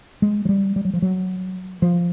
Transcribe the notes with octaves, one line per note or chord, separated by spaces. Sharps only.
G#3
F#3
G3
G3
F#3
F3
F#3
F3